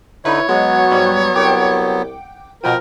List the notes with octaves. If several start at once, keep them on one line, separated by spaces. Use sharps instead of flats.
D3 D#4 E4 B4 C#5
F#3 G#3 B3 F#4
G#2 G3
C2 F#5 G5 D6
B2 F3 B3 A#4 G5 D#7